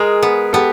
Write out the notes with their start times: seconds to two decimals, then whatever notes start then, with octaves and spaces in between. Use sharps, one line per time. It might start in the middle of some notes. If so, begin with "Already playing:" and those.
Already playing: G#3 G#4 A#4
0.23 B3
0.53 B3 G4 A4